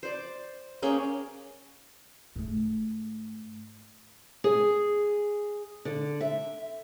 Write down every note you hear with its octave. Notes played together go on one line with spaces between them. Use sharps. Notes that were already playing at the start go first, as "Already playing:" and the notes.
C5 D5
A#3 C#4 G#4 G5
G#2 A3
G#4
D3
E5